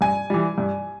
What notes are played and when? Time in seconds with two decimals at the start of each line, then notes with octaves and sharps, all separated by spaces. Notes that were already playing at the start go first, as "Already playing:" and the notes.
0.01 G2 G#5
0.30 E3 G3
0.58 G2